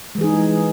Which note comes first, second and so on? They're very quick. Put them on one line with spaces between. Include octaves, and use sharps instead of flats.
G#3 E3 G#4 D#4